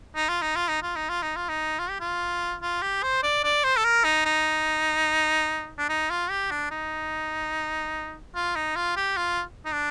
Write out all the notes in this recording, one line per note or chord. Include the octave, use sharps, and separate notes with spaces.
D#4
F4
D#4
F4
D#4
F4
D#4
F4
D#4
F4
D#4
F4
G4
F4
F4
G4
C5
D5
D5
C5
A4
A#4
D#4
D#4
D4
D#4
F4
G4
D4
D#4
F4
D#4
F4
G4
F4
D#4
D4